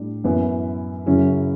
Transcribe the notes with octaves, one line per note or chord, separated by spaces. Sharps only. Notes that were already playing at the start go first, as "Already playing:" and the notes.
Already playing: A2 G3 D4
F#2 E3 B3 E4 B4
F#2 C#3 F#3 C#4 E4